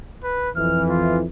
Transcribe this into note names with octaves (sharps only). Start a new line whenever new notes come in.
B4
F2 E3 F6
F4